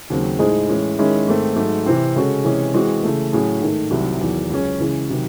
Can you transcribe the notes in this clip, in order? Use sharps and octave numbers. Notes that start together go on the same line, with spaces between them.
D#2 C#3 F#3 C4
A2 G#3 D#4 G#4 C5
A2 E3 G#3 C#4
D#3 G#3 C#4 E4
G#2 D#3 A3 C4
G#2 F#3 A3
C3 E3 C4
C#3 G#3 C#4 F#4 A4
C3 E3 G#3 C#4 G#4
E3 G#3 C4 F#4
C#3 E3 A3
A2 F#3 C#4 G#4
G#2 D#3 A3
C2 C3 D#3 F#3
E2 D#3 F#3
C#2 C#3 F#3 C#4
C#3 E3 G#3 C#4
C3 D#3 F#3